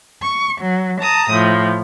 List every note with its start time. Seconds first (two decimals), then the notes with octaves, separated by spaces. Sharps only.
0.23 C#6
0.60 F#3
1.00 A5 A#5 D#6
1.33 A2 F3